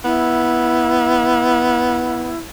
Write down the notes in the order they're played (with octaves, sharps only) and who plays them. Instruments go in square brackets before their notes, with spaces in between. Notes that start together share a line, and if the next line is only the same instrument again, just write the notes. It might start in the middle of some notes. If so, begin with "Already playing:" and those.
[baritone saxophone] B3 [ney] E4